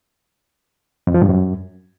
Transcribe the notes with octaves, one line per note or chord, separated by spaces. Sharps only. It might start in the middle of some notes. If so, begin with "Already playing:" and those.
F2
F3
G2
F#2